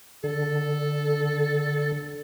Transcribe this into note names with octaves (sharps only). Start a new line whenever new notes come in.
D3 A4